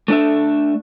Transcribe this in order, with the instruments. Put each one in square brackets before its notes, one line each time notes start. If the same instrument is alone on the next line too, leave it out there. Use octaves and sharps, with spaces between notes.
[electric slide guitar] A3 D4 A4 E5